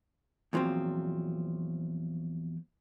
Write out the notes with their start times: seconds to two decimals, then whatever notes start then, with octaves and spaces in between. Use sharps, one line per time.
0.53 E2 A#2 F3 F#3 C4